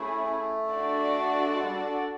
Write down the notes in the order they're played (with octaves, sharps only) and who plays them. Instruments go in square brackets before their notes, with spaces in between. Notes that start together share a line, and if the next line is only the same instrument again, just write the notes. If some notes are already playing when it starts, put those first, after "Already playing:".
Already playing: [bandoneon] A3 [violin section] C#4 E4 G#4
[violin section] D4 F#4 A4 D5
[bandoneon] G#3
G3